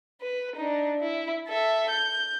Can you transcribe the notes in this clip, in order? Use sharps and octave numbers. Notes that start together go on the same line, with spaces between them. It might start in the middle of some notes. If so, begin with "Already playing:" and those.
B4
D4 D#4
E4
A4 E5
G6